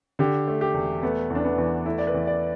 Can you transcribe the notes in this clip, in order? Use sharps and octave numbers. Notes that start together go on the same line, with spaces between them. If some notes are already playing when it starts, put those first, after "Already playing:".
D3 G4
A3
G4
E1
A3 B3
E2
D4
B3
E2
A3 E4
D5
B4
E2
D5